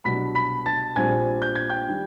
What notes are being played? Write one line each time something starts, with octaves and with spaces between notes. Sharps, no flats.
C2 B2 F#3 B3 D4 B5 B6
B5 B6
A5 A6
A#1 A#2 G3 C4 G#5 G#6
G6
G#6
G5 G6
D#3 G3